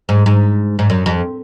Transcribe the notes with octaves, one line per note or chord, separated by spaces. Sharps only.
G#2
G#2
G#2
F#2
F2